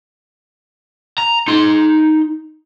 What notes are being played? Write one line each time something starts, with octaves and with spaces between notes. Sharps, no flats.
A#5
D#4 C6